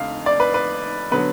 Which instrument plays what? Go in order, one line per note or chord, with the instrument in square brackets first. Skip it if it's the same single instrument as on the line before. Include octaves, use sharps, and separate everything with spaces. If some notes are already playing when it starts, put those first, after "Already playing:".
Already playing: [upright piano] F1 F2 D3 F5
D5
B4
B4
D3 F#3 B3 B4